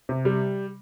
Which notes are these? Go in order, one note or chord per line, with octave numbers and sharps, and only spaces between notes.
C3
G3